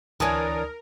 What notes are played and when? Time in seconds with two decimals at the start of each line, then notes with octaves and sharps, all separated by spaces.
0.20 D2 E3 D4 A#4 C#5 G#5 A5 D#6